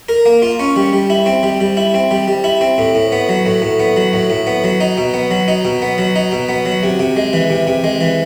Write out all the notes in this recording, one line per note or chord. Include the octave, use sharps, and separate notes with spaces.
A#4
A#3
F4
C#4
G3
G3
E4
C4
G3
G3
E4
C4
G3
G3
E4
C4
A2
A2
B3
F#3
A2
A2
B3
F#3
A2
A2
B3
F#3
D#4
B2
B3
F#3
D#4
B2
B3
F#3
D#4
B2
B3
F#3
C3
C3
G#3
E3
C3
C3
G#3
E3